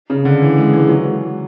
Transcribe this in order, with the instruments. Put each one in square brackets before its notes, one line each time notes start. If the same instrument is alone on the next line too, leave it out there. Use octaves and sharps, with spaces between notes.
[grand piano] C#3
D3
E3
G#3
E3
F#3